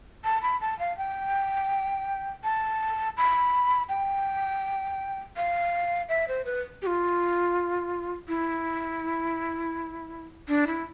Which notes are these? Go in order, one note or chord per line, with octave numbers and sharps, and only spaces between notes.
A5
B5
A5
F5
G5
A5
B5
G5
F5
E5
C5
B4
G4
F4
E4
D4
E4